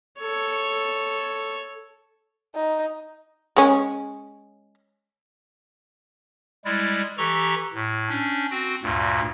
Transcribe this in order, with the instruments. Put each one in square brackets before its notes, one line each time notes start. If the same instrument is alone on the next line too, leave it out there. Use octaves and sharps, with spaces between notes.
[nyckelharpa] A4 C#5
[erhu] D#4
[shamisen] G#3 C#4
[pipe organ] G3 G#3 E4 A6
E3 G4 A4 A#5 C#6
A2
C#4 D4 G6
C4 F#4 G5
D2 G2 A#2